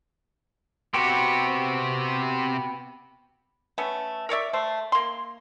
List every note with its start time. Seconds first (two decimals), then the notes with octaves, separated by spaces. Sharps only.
0.94 C3 B3 C4 F#4 G4
3.78 A3 B3 C#4
4.29 A#4 C#5 D5 E5
4.53 A3 C5
4.92 A#3 C6